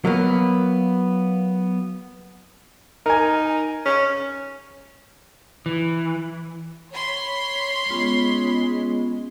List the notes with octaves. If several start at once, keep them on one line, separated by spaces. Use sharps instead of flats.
F#3 A#3 B3
D#4 A#4 G#5
C#4
E3
C#5 B5 C6
G#3 B3 C#4 F4